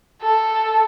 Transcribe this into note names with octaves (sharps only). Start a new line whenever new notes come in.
A4